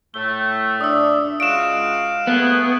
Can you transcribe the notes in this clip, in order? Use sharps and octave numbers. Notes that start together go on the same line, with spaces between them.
A2 A3 G7
D4 D5 E5 D#6 E6
C#2 G#3 F#4 F5 D7 E7
A3 B3 G#4